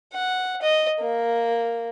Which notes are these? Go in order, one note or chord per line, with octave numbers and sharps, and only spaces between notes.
F#5
D#5
A#3